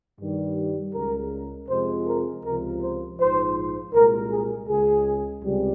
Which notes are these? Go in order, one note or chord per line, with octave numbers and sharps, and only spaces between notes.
G2 D#3 G3
C#2 C#3 G#3 A#4
F2 C3 F3 G#3 C5
A#4
C#2 C3 F3 A#4
C5
A#1 G#2 F3 C5
C2 A#2 G#3 A#4
G#4
C#2 C#3 G#3 G#4
C#2 C3 G3